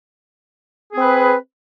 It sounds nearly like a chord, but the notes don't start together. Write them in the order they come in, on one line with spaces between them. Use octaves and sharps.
G#4 C4 B4